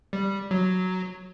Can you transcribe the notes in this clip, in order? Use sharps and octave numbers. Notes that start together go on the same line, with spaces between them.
G3
F#3